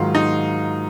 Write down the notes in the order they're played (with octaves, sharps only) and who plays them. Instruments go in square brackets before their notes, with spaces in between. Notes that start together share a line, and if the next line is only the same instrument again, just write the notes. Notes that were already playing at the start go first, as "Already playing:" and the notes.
Already playing: [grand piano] G#2 D#3 F#3 [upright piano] F4
[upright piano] D#4